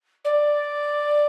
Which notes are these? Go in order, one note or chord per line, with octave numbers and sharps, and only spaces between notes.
D5